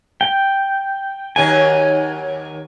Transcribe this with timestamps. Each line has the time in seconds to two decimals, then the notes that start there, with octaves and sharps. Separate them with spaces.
0.21 G5
1.36 D#2 F#3 D#4 G#5